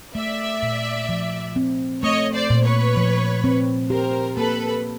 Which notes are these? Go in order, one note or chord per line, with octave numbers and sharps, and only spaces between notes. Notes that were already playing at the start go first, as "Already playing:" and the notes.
A3 D5 E5
A#2
F3
C4
A3 C#5 D#5
C5 D5
A#2
B4 C#5
F3
C4
G4 A#4 C5
A#3 A4 B4